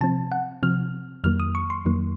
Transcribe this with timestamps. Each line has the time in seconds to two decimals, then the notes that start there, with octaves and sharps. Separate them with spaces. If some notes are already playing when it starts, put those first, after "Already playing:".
0.01 C3 F3 C4 A5
0.32 F#5
0.63 C3 F3 C4 F6
1.24 F2 D#3 F#3 A#3 F6
1.40 D#6
1.55 C#6
1.70 C6
1.85 F2 D#3 F#3 A#3